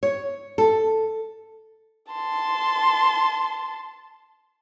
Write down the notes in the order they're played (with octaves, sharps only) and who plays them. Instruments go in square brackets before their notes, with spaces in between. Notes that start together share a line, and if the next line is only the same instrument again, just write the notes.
[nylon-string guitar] C#5
A4
[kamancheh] A5 C6